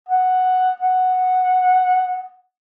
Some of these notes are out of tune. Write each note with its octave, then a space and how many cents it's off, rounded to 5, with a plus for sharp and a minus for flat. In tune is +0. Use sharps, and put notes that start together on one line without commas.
F#5 +0
F#5 -5